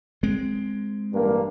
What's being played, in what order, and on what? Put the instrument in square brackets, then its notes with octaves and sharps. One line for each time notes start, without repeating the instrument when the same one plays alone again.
[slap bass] G#3 C4
[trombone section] A1 G2 A#3